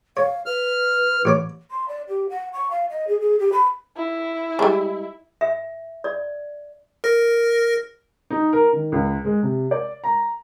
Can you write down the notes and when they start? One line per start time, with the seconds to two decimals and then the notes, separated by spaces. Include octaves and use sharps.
0.17 C#5 F5
0.46 B4 F6
1.25 A1 C#5 D6
1.71 C6
1.89 D5
2.08 G4
2.29 F#5
2.53 C#6
2.71 F5
2.90 D#5
3.08 G#4
3.20 G#4
3.39 G4
3.52 B5
3.96 E4
4.59 G3 G#3
5.41 E5
6.04 D5
7.04 A#4 A#6
8.30 D#4
8.53 A#4
8.73 D#3
8.92 C#2
9.25 G#3
9.43 C3
9.71 D5
10.04 A#5